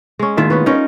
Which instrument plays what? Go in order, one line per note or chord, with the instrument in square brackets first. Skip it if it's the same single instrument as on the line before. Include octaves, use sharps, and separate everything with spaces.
[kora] G#3 C#4
[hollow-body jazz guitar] D#2 A2 D#3 [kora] F4 E5
[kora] B3 C#4 B4
[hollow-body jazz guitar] C#4 D#4 [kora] A#4 C#5